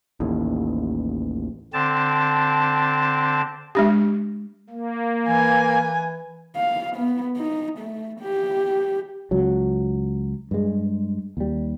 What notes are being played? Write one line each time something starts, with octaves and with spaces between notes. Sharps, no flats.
A1 D#2 A2
D3 C4 A5
G#3 D4 G4
A#3
E3 G#5
F5
B3
D#4
A3
G4
C#2 F#3
G2 G#3
D#2 G3